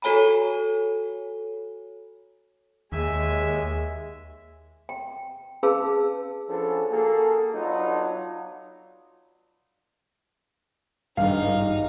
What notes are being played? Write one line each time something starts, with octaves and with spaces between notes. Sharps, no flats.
F#4 A4 C#5 G#5 A#5 B5
D#2 G#3 E5 G#5
G5
C#4 G#4 B4 F5 A5 E6
F3 B3 C#4 D4 G#4 A4
A#3 F#4 G#4 A4
F#3 B3 D4 D#4 F4
D#1 G#1 G2 D#4 F5